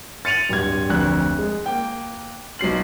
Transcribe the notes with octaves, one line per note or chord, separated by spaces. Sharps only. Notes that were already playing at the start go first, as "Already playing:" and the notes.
A6 C#7 D#7 F7 F#7
D1 G2 G#6
F1 D2 F#6
G#3
A#3 G5
B1 F#3 C7 F#7